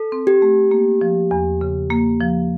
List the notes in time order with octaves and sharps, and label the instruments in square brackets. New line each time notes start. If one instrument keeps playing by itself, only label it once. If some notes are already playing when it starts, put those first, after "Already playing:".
Already playing: [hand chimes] A4
[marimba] C4
[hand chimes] G4
[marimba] A3
A#3
F3
E2
C#3
A#3
F3